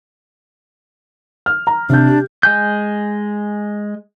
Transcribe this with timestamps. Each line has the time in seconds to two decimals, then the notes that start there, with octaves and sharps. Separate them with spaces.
1.46 F6
1.67 A#5
1.89 C3 D4 G6
2.08 G4
2.43 G#3 G#5 G6